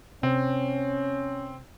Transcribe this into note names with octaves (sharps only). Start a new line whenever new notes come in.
C3 C4 C#4